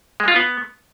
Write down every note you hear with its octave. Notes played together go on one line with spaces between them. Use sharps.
G#3
F4
B3